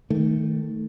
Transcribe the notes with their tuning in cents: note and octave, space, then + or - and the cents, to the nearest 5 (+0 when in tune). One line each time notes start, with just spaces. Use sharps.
D#3 +15 A3 +0